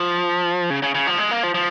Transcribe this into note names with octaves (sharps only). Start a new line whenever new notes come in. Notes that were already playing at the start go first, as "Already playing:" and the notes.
Already playing: F3
C#3
C#3
C#3
F3
G#3
A#3
F3
F3